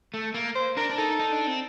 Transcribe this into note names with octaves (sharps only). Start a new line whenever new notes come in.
A3
A#3
C5
D4 A#4
D4
D#4 A4
D#4
D4
C4